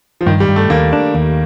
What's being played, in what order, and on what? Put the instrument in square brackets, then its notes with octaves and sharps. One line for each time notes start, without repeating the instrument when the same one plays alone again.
[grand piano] F3
[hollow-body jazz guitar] G2 [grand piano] D#3
[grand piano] G3
[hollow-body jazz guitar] G2
[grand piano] A3
[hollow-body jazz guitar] D#2 [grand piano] A#3
[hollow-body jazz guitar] D4
D#2